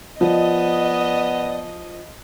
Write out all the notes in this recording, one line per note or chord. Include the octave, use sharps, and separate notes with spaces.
F3 B3 D5 D#5